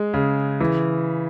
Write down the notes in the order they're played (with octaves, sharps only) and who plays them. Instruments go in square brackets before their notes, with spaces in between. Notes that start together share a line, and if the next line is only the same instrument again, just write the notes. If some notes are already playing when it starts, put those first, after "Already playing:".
Already playing: [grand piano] G#3
C#3
E3